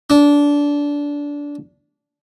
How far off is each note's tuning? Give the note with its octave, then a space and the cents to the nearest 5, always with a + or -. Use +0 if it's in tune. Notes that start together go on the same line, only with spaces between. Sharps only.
D4 -20